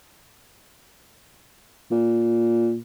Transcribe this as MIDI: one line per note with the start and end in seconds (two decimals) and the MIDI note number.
1.92 2.77 46